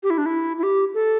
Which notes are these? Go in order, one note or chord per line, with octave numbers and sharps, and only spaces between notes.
G4
E4
D4
E4
E4
G4
A4